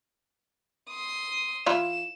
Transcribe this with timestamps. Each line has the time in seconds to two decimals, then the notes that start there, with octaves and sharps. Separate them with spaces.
0.90 C6 D#6
1.66 E3 E4 F4 E7